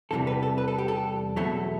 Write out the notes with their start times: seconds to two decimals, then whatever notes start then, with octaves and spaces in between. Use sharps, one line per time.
0.11 E2 C3 E3 G3 A4
0.27 B4
0.43 A4
0.58 B4
0.68 A4
0.78 G4
0.88 A4
1.36 E2 B2 F#3 A3 A4